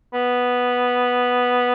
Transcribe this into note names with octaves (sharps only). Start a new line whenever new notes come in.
B3